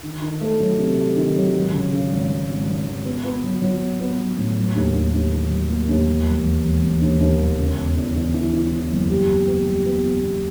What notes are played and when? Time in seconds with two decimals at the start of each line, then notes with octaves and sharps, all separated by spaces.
0.03 D#3
0.22 D#3
0.41 A3
0.60 F#3
0.79 C3
0.98 A3
1.16 D#3
1.36 F#3
1.55 G#1
1.73 C#3
1.92 C#3
2.11 G#1
2.30 G#1
2.49 G#1
2.68 G#1
2.86 G#1
3.05 B3
3.24 B3
3.43 F#3
3.62 F#3
3.81 B3
4.00 B3
4.18 F#3
4.37 A2
4.57 F#3
4.75 D#2
4.94 D#2
5.14 D#2
5.32 D#3
5.51 F#3
5.70 A#3
5.89 D#2
6.08 E1
6.27 E1
6.45 E1
6.64 E1
6.83 E1
7.01 D#2
7.20 D#2
7.39 E1
7.59 C#3
7.78 E2
7.96 E2
8.15 E2
8.34 E3
8.53 E3
8.72 E3
8.91 F#1
9.10 G3
9.28 B3
9.47 B3
9.66 G3
9.85 B3
10.04 B3
10.23 B2